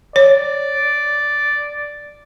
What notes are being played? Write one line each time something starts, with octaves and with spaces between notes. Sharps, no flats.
C#5 D5